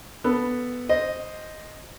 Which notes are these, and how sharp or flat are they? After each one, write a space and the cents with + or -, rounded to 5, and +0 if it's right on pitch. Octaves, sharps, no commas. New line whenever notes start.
B3 +0 A4 +0
C5 +0 D#5 +0